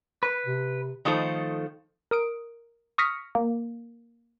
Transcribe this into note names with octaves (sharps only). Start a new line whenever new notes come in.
B4
C3
D#3 F3 A3 D#4 A4 C5
A#4 D#6 D7
C#6 D#6 F6 A#6 B6 C#7
A#3